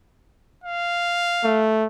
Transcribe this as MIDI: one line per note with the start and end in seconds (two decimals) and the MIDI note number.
0.64 1.70 77
1.44 1.87 57